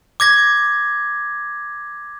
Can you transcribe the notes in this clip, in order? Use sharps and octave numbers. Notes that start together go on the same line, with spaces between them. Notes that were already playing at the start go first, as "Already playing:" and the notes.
D6 G#6 A#6